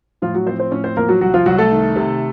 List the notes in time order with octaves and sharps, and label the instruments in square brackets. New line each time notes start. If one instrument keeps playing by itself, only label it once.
[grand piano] A2 F3 F4
F#3 F#4
F3 C4 C5
C4 C5
A2 C#4 C#5
C4 C5
F3 A#3 A#4
F#3 F#4
C2 F#3 F#4
F3 F4
C2 F#3 F#4
A3 A4
D#3
C3